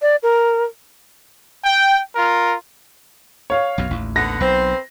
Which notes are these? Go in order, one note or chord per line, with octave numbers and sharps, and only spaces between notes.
D5
A#4
G5
F4 A#4
C#5 F5
B1 F#2 B2
A1 D#2
D3 B3 F#5 A#6
B1 C4 B4 C5